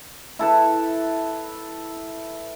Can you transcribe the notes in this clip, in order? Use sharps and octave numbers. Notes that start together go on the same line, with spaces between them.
E4 A4 B4